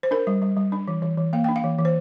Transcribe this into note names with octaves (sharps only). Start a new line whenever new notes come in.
C5
D4 A#4
G3
G3
G3
D4
E3
E3
E3
A#3 F5
D4 G5
F5
E3
E3
C5